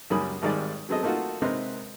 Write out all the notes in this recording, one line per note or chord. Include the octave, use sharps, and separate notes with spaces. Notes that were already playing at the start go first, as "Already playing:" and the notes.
C#2 F#2 G3 A#3 B5 D#6
G#1 G#2 D#3 G3 D5
F#3 B3 C4 G#4 A4 D#5
A3 A#3 D#4 F4 F#4
C3 G#3 C4 D#4 A#4 B4